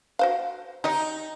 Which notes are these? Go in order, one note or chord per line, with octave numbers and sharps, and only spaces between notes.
F#4 C5 F5
D#4 G4 D#5